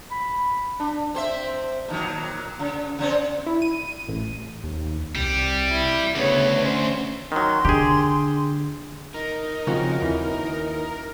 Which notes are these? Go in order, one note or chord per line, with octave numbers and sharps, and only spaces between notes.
B5
D4
C4 C5 E5
A#2 D#3 F#3
C#3
C#3 C4 C#4
E4
D#7
A1
D#2
C2 G3
E4
D2 C#3 B3 C#5
C#4 C5
D#3 F#3 C6
D3 G4 G#4
D#4 A#4
C#3 F3 C4 C#4 F#4
D#2 E3